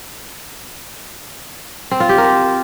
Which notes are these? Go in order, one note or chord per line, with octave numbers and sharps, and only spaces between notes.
C4
F4
G4
A#4